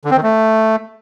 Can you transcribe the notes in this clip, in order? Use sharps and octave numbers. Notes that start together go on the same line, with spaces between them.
D3
C4
D#3
A3